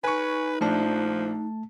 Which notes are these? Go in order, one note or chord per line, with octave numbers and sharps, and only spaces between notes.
D#4 B4 G#5 C#6
A#1 F3 A3 D4 A5